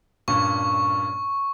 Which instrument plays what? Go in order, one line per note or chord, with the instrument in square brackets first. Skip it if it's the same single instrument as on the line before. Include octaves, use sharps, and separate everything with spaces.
[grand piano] G2 A#2 C#4 [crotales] C#6